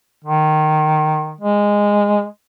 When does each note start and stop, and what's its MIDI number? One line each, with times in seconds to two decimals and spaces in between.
0.24 1.35 51
1.41 2.25 56